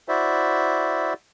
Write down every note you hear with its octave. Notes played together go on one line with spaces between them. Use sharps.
E4 F#4 C5 D5 E5